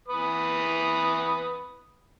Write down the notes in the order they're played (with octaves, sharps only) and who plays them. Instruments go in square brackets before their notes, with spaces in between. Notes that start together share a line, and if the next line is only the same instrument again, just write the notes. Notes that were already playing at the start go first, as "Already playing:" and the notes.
[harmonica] E3 B4 D#6